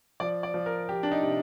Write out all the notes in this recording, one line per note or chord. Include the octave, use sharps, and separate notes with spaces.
F3 D5
D5
F3
A#4
F3 G4
D4
D#4
C3